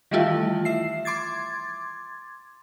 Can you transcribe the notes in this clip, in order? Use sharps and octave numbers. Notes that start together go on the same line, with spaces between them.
D#3 E3 G3 A3 E4 F4
E5 C7
C6 D6 G#6 A6